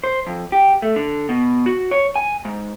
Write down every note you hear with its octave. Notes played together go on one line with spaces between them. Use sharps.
C5
F2
G4
A3
D3
B2
F#4
C#5
G#5
G#2